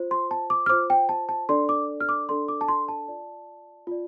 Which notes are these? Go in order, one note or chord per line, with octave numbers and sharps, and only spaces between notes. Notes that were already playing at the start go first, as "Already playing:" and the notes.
Already playing: F4 C5
C6
A5
D6
F6
F4 C5 D6
G5
A5
A5
D4 A4 D5 C6
D6
F6
D6
D4 A4 D5 C6
D6
A5
C6
A5
F4 D5
F4 D5